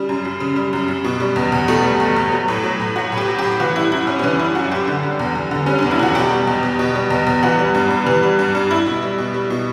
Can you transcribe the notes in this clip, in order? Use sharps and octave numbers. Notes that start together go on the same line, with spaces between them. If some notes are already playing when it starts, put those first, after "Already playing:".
Already playing: C#3 G3
F#2
F#2
C#3
G3
F#2
F#2
B2
G3
E2
E2
B2 A3
G3
E2
E2
F#3
A2
F#3
A2
F#3 F#4
A2
G4
F#3
G4
A2
E3 F#4
G3 E4
F#2 E4
F#2 C#4
C#4
E3 D4
G3 E4
F#2 F#4
F#2 G4
D3
G3
E2
E2
D3
G3 C#4
E2 D4
E4
E2 F#4
B2 G4
G3
E2
E2
B2
G3
E2
E2
E3 F#4
G3
G2
G2
E3
G3
G2
G2
G3 E4
B2
G3
B2
G3
B2